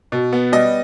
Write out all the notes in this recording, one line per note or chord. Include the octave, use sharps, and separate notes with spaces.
B2
B3
G3 D#5